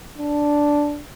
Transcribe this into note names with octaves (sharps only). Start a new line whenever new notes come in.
D4